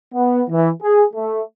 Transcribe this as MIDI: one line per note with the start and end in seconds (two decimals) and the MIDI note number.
0.13 0.41 59
0.48 0.69 52
0.81 1.04 68
1.13 1.41 57